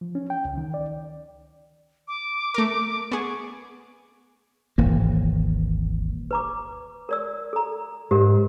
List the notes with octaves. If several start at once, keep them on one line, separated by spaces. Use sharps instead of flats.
F3
C#4
G5
C#2
D#3
D5
D6
A3 A#4
B3 G#4 C#6
D#1 G#1 E3 A#3
B4 A#5 D6
A#4 D5 E6
A4 A#5
G#2 G4 A#4 D#5